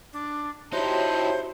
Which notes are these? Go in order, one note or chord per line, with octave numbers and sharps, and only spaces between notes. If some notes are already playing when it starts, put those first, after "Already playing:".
D4
D#4 E4 F#4 G4 C5 C#5 E5 A5